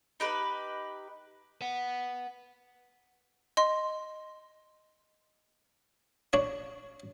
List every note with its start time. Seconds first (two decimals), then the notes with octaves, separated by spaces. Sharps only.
0.20 D#4 G4 B4
1.61 B4 F#5
3.57 D#5 C6
6.33 D4 C#5